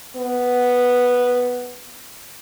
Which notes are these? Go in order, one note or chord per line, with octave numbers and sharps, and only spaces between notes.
B3